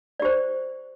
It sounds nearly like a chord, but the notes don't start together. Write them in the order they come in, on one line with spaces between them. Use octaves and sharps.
D5 G4 C5